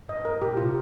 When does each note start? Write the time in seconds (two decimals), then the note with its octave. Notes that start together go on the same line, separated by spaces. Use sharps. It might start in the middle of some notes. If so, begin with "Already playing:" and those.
0.09 G2 D#5
0.25 A#4
0.41 A#2 G4
0.57 C3 F4